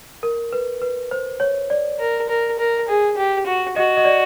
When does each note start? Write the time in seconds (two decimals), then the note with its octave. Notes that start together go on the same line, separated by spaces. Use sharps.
0.23 A#4
0.52 B4
0.82 B4
1.11 C5
1.40 C#5
1.70 D5
1.99 A#4
2.29 A#4
2.58 A#4
2.88 G#4
3.17 G4
3.46 F#4
3.76 F#4 D#5
3.97 D#5
4.05 D5